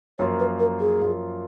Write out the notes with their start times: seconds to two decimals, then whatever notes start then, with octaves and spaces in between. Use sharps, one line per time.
0.19 F#2 F3 A#3 F4 C#5
0.39 B4
0.59 A#4
0.80 G#4
1.01 F#2 F3 A#3 F4